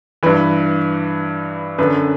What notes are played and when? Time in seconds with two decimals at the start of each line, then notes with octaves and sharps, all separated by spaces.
0.23 G2 E3 B4
1.78 F#2 D3 B4